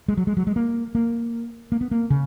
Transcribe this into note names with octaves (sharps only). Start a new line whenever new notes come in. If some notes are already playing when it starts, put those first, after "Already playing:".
G#3
F#3
G#3
F#3
G#3
A#3
A#3
A#3
B3
A#3
C#3